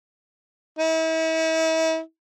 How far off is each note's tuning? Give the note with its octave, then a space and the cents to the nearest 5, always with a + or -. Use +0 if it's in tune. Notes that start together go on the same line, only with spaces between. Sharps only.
E4 -40